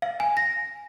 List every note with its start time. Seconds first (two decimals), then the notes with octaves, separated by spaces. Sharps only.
0.02 F5
0.20 G#5
0.37 A#6